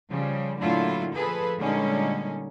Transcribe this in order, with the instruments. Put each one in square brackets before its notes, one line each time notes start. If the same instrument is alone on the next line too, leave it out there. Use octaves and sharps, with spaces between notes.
[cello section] C#3 F3 G3
A#2 D3 F#3 A3 E4 F4
F3 G#4 A4 B4
A#2 D3 G3 G#3 C#4 D#4